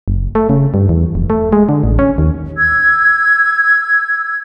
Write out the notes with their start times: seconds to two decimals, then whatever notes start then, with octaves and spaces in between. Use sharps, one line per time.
0.08 F#1
0.35 A3
0.49 C#3
0.74 G2
0.89 E2
1.15 F1
1.30 A3
1.53 G#3
1.69 D3
1.84 A1
1.99 C#4
2.18 D#2
2.57 E6 G#6